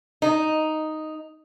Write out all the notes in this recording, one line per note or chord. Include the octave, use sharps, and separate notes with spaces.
D#4